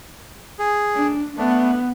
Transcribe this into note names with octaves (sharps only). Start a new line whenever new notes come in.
G#4
D4
A3 B3 D4